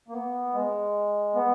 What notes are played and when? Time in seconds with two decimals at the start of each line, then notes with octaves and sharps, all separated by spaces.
0.08 A#3
0.14 B3
0.54 G#3
1.35 B3